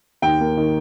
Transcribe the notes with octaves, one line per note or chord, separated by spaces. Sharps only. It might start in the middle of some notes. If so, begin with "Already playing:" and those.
D#2 G5
A#3
D#3